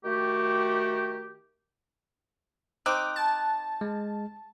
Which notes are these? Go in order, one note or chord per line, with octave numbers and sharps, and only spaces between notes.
D#3 A3 F#4 G4
C4 D#4 D6 F#6
A5
G#3